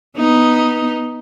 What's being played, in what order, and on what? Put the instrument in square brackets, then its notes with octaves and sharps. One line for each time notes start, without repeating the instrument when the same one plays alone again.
[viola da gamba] B3 D#4